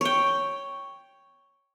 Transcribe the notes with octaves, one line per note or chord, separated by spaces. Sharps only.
C#5 G5